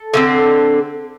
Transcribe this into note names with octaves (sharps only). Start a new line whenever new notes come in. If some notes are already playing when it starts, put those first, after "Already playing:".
Already playing: A4
D3 A3 C4